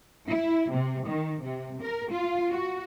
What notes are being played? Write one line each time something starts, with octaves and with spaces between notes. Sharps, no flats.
E4
C3
D#3
C3
A#4
F4
F#4